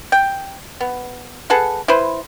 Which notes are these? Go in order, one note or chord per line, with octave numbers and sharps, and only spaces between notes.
G5
B3
G#4 A4 B4 F#5
E4 B4 C5